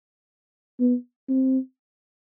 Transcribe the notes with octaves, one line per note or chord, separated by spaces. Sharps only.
B3
C4